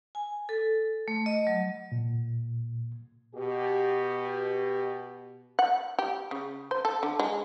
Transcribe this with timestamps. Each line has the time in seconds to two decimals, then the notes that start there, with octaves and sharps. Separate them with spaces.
0.15 G#5
0.49 A4
1.08 A3
1.26 D#5
1.47 F#3
1.92 A#2
3.36 B2 G4
5.59 F#5
5.99 G4
6.31 C#3
6.71 C5
6.85 A4
7.03 D3
7.19 G#3